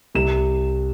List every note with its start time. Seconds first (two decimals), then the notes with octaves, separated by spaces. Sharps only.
0.15 C2 E7